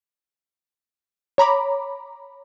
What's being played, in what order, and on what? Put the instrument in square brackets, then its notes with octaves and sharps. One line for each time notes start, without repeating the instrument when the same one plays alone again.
[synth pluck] C#5 A#5 B5 D6